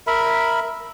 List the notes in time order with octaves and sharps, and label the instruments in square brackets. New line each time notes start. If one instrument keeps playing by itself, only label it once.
[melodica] A#4 E5 B5